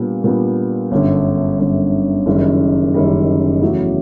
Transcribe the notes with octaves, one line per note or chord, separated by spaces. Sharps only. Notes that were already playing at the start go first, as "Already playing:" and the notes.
Already playing: A#2 G3 B3 D4
A#2 G3 B3 D4
G1 F#2 D3
G1 F#2 D3
F#1 F#2 D#3 G3
F#1 F#2 D#3 G3
E2 C#3 F#3 A3